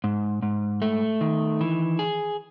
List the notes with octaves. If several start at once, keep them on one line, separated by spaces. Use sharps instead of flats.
G#2
G#2
A3
D#3
E3
G#4